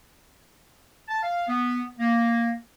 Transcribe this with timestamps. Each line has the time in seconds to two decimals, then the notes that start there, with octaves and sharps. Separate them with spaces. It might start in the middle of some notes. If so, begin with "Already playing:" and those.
1.08 A5
1.23 F5
1.48 B3
1.99 A#3